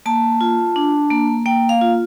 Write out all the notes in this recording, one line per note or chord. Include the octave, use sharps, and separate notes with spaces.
A#3 A5
F4
D4
A#3
A#3 G5
F5
F4